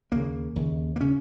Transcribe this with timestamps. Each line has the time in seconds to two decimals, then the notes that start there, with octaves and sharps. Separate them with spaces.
0.12 D#2 C#3 A#3
0.56 D#2 C#3
0.96 A#3
1.01 C#3 C#4